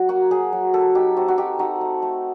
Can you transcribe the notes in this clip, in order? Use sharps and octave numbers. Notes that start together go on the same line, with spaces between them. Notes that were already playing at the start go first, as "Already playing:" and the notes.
Already playing: F#3
A#3 F#4
F#3 G#4
F#3
A#3 A4
D#4 G4
C4 F#4
F#4
D#4 G4
D#4 F#4
A3
A3